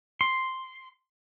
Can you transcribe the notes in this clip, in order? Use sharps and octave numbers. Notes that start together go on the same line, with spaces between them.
C6